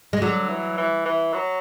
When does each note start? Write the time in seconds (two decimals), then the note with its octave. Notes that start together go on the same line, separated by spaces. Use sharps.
0.13 G#3
0.21 D3 F#3
0.49 E3
0.78 E3
1.05 E3
1.34 F#3